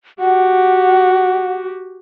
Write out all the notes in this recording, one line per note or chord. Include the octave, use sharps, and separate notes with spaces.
F#4 G4 F#5